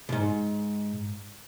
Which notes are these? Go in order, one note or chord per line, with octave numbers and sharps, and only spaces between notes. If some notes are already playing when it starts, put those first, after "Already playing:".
C2 G#2